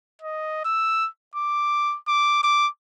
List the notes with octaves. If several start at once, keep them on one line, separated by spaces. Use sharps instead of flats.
D#5
E6
D6
D6
D6